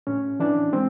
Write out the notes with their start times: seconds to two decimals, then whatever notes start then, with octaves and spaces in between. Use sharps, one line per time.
0.07 A2 C#4
0.40 E3 D4
0.72 G#3 C4